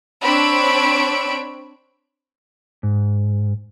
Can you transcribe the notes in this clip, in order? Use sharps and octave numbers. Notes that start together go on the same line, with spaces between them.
C4 D4 C#5 B5 E6 D7
G#2